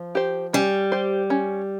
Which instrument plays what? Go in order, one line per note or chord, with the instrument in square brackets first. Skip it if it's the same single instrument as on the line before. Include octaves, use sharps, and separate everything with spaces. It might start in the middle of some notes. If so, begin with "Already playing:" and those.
Already playing: [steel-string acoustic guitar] F3
[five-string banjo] G4 C5
[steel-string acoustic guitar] G3 [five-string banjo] C#4
[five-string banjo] G4 C5
C#4